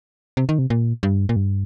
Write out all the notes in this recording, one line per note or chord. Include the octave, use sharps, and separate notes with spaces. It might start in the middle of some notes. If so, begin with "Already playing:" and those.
C3
D#3
C3
A#2
G2
A#2
G2